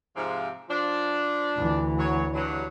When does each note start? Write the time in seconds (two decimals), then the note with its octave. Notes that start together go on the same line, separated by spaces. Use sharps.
0.16 G#2 C3 F3
0.69 F3 D4
1.58 D2 E3
1.98 F#3 C#5
2.34 G2 F#3